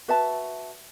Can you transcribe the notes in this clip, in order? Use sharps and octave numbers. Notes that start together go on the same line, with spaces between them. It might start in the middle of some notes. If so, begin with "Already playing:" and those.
F#4 B4 E5 A5